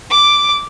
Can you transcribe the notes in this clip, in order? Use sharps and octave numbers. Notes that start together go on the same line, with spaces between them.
D6